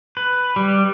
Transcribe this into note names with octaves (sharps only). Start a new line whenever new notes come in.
B4
G3